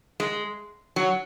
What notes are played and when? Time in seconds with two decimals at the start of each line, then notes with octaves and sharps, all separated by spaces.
0.20 G#3
0.96 F#3